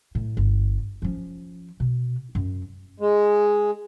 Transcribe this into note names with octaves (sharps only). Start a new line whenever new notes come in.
A2
G1
F3 C#4
B2
F#2
G#3